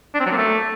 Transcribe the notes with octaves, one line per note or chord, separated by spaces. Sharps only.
D4
C4
F#3
A#3
A3